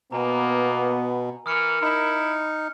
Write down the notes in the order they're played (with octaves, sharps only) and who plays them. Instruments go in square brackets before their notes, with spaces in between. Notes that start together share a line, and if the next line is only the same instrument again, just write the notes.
[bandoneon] B2 [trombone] A#3 [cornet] B3 [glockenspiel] G#5 A#5
[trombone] E3 [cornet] A#4 [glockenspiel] D#6 F6 C#7
[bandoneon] D#4 [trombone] E4